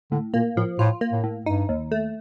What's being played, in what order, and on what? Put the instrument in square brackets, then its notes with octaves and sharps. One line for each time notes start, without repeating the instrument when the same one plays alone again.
[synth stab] A2 [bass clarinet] D3
[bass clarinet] A#2 [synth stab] A#3
[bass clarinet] A2 [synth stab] F3
[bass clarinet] A2 [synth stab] F4
[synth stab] A#3
[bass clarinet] A2
[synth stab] A2
[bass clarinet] G2 [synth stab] D#4
[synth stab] D#2
A3